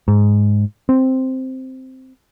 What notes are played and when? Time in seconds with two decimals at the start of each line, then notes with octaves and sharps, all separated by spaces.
0.08 G#2
0.89 C4